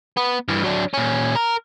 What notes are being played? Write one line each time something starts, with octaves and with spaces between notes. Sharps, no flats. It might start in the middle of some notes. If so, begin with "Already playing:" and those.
B3
G2 E3
F#3 D4
A#2 C#4
A#4